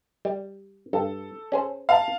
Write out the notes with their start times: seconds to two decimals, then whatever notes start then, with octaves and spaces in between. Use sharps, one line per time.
0.25 G3
0.93 G2 A4
1.52 C#4 G#4 C5
1.89 F5 A5